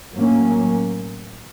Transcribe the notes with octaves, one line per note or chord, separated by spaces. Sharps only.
A2 F#3 A#3 C#4